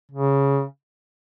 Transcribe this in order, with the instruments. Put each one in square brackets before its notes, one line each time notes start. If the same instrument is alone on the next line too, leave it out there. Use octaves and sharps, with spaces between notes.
[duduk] C#3